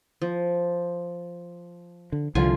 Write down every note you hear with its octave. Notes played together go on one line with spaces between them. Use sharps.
F3
D3
C2 D3 F3 F4 G#5